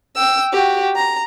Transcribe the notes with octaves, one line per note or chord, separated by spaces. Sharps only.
G5 E6
F#4 G4
A#5